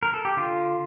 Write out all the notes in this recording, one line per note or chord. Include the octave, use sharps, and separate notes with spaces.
A#4
A4
G4
D3 F4